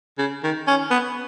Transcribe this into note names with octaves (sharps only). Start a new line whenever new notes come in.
C#3
D#3
C#4
B3